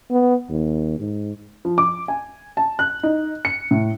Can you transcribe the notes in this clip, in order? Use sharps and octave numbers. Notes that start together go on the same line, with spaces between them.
B3
D#2
G#2
F3
D6
G#5
A5
F#6
D#4
C#7
A2